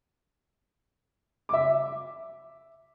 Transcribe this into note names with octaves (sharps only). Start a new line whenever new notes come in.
E5 D6